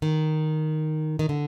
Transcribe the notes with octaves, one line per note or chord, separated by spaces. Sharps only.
D#3
D#3
D3